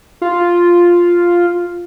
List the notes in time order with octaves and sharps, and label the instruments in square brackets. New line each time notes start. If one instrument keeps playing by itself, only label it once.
[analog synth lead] F4